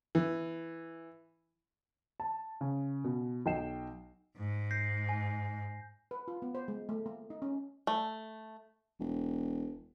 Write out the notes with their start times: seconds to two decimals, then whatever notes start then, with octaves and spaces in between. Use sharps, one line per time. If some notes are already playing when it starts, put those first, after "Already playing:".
0.15 E3
2.20 A5
2.61 C#3
3.04 B2
3.46 B1 D#5 G5 C7 E7
4.37 G#2
4.71 G6 A#6 C7
5.09 G#5
6.11 B4
6.28 F4
6.42 B3
6.55 C5
6.68 G#3
6.89 A3
7.06 A#3
7.30 D#4
7.42 C#4
7.87 A3
9.00 E1